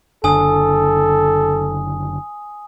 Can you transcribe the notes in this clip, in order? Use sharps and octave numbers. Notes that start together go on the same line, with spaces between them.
F#1 D3 A4 G#5 D#6